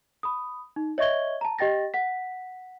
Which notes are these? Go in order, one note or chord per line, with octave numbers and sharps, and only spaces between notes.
B5 D#6
D#4
C#5 D#5 E5 C#6 G#6 G7
A5 A#5
G4 D#5 G5 A6 A#6
F#5 B6